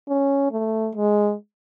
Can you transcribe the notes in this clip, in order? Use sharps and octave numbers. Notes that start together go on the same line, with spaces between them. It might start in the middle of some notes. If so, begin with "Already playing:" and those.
C#4
A3
G#3